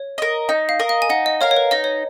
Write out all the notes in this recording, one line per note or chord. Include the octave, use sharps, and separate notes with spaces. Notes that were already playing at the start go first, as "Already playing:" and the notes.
Already playing: C#5
A#4 D#5
D#4 D#5
F5
A#4 D#5
F5
G#5
D#4 F#5
D#5
A#4 C#5 F5
C#5
B4
D#4 D#5
C#5